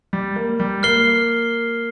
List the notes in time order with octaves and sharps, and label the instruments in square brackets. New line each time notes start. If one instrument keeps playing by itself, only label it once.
[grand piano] G3
A#3
G3
[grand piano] A#3 [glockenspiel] F6 C7 G7